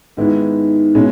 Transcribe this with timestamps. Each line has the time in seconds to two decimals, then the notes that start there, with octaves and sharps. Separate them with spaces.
0.17 G#2 D#3 G#3 B3 E4
0.95 B2 G#3 C#4 E4